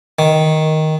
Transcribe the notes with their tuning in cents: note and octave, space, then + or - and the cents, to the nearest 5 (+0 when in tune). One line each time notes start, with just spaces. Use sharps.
D#3 +5